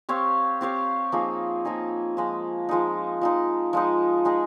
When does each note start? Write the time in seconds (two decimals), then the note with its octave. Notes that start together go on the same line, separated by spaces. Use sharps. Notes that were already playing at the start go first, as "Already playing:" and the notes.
0.09 C4 G4 C#5 F5
0.61 C4 G4 C#5 F5
1.12 F3 A#3 D#4 G#4
1.65 F3 A#3 D#4 G#4
2.17 F3 G#3 D#4
2.69 F3 G#3 D#4
3.21 F3 G#3 D#4
3.73 F3 G#3 D#4
4.25 G#3 D#4 G#4